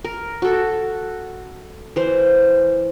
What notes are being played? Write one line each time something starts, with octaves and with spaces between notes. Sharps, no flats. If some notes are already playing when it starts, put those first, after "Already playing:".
A#4
F#4 A4
E3 C5